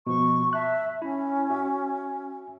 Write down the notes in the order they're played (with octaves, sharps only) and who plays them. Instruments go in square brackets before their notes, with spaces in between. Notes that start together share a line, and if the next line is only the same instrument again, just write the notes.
[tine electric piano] B2 F3 [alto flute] C#6
[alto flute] E5 [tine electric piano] A5 F#6
[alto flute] C#4 [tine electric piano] E4
[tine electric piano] F#4 E5